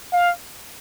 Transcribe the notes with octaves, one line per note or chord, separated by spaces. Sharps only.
F5